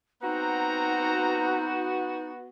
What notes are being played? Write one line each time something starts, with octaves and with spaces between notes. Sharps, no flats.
B3 C4 D#4 F#4 F#5 A#5